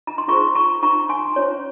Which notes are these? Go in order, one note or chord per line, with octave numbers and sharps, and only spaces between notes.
A#5
C6
F4 G#4 C5 A#5 C#6
A#5 C#6
A#5 C#6
G#5 C6
C#4 F4 C5 C#5